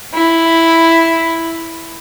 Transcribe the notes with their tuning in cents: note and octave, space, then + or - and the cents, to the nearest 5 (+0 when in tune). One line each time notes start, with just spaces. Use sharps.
E4 +0